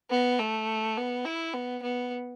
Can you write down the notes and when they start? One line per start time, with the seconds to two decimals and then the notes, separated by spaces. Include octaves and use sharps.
0.11 B3
0.39 A3
0.97 B3
1.25 E4
1.54 B3
1.83 B3